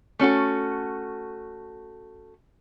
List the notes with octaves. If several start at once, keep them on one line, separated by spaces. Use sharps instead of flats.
A3 C#4 F#4 A4